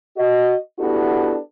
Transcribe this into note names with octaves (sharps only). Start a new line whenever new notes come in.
F#4 D#5
B3 D4 E4 F#4 G4 A4